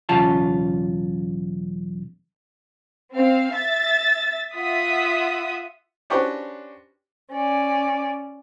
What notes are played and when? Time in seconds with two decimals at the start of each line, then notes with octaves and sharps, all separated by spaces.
0.09 B1 E2 C#3 C#4 F4 A5
3.13 C4 F5
3.53 E5 A6
4.53 F4 E5 F#5 D#6 B6
6.10 C#4 D4 F#4 G4 B4 C5
7.32 C#4 D5